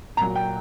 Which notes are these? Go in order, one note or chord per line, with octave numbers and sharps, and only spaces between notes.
A#2 F#3 A#5
G5